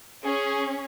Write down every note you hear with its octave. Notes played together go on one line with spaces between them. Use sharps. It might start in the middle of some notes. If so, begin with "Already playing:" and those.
C#4 G#4